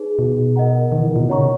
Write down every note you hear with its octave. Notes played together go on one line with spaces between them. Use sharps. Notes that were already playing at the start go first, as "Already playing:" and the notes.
Already playing: D#4 G#4 B4
B2
A#4 D#5 F#5 A#5
D#3
E3
D#3
A#2
B2
C#3 C#5 F#5 A#5 C#6